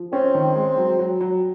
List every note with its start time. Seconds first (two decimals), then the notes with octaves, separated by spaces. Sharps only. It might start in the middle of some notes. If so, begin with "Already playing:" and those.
Already playing: F3
0.13 C4 C#4
0.34 D#3
0.56 G#3
0.78 F#3
0.99 F#3
1.21 F#3